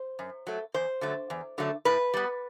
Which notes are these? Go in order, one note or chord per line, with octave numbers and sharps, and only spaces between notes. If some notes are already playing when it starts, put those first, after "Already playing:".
Already playing: C5
F#2
F#3 A3
E2 C5
D3 F#3 A3
E2
D3 F#3 A3
A2 B4
G3 B3